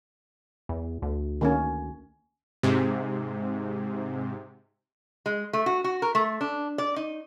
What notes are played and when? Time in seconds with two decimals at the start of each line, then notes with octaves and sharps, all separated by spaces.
0.69 E2
1.02 D2
1.41 D#3 A#3 C#4
2.63 G#2 C3
5.26 G#3
5.53 A3
5.66 F#4
5.84 F#4
6.02 A#4
6.15 A3
6.41 D4
6.78 D5
6.96 D#4